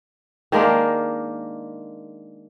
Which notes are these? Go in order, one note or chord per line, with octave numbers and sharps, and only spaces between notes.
D#3 G#3 A#3 D4